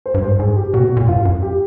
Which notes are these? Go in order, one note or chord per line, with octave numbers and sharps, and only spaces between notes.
C5
G2
G#2 C5
G#2 G#4
G4
A#2 F#4
C3
B2
A#2
G2 F4
F#2
G4